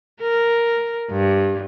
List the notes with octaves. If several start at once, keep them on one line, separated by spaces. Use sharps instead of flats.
A#4
G2